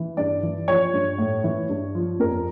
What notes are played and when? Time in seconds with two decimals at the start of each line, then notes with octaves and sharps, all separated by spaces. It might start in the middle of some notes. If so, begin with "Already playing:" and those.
Already playing: E3
0.17 G2 D5
0.43 E3
0.68 F3 C#5
0.93 G2
1.18 A2
1.44 E3
1.69 G2
1.95 F3
2.19 F2 A#4